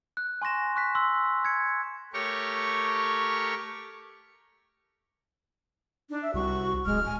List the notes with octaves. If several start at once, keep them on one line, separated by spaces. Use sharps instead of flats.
F#6
G#5 C6 C#6 A#6 E7
C#6 F#6 B6
C6 E6 F#6
G#6 C#7
A3 G4 A#4 C#5 C#6
D4 D#4
E5
C2 F#4 C#6
D1 G#3 F6
G#5